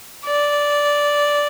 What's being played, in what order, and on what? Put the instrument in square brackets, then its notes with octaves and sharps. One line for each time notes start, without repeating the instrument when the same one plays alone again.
[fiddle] D5